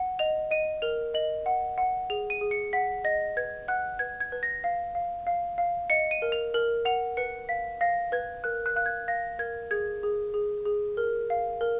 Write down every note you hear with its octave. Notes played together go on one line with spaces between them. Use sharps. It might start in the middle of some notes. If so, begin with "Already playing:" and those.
Already playing: F#5
D#5 F7
D#5 D#7
A#4 F7
D#5 F#7
F#5
F#5
G#4 F7
D#7
G#4
C#7
F#5 B6
D#5 A#6
B4 G#6
F#5 F#6
B4 G#6
G#6
B4
A#6
F5
F5
F5
F5
D#5 C#7
D#7
A#4
F7
A#4 F#7
F#5 F7
B4 C#7
F5 B6
F5 A#6
B4 G#6
A#4 F#6
F#6
F5 F#6
G#6
F5 A#6
A#4 G#6
G#4 G#6
G#4
G#4
G#4
A#4
F5
A#4